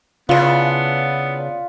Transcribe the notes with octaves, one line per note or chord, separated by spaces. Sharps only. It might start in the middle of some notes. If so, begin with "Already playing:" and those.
C#3 B3 D4 E4 F4